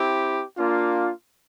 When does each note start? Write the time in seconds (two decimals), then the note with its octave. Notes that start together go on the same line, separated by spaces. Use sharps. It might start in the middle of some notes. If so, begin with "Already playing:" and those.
Already playing: C4 E4 G4
0.57 A#3 D4 F4